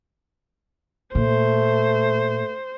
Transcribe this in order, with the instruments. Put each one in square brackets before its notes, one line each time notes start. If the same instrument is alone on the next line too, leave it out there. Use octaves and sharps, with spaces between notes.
[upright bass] A#2 [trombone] A3 [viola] C5